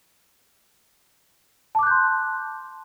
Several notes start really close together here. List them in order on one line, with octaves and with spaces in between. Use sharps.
A5 D6 F#6 G6 C6